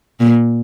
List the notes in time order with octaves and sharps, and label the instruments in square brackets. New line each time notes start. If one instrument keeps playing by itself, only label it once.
[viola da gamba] A#2